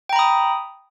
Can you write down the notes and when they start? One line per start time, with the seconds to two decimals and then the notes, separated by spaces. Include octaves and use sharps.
0.09 G5
0.13 A#5
0.16 B5
0.19 D#6